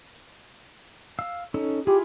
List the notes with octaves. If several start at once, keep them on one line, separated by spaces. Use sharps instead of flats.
F5 E6
C#4 D#4 A4
E4 F4 G4 G#4